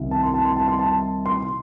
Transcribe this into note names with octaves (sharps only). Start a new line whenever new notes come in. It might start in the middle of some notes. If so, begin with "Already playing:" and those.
Already playing: C2 C3 D#3
A5
C6
A5
C6
A5
C6
A5
C6